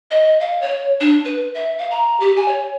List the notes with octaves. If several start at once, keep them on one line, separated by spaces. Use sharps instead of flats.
D#5
F5
C#5
D4
B4
E5
F5
A#5
G4
G#5
C#5